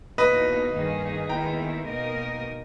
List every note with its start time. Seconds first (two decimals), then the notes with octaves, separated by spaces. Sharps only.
0.18 E2 B2 A#3 D#4 B4 D#5
0.74 G2 D#3 A#3 D#4 G#4
1.29 D#2 D#3 G#3 B3 E4 G5 A#5
1.86 B2 A#3 D#4 A#4 D#5